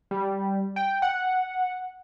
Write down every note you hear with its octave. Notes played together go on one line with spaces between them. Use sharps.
G3
G5
F#5